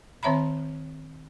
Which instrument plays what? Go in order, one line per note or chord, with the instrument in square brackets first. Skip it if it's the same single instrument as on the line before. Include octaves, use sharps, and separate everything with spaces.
[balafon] D#3 C4 C#5 E5 A#5 B5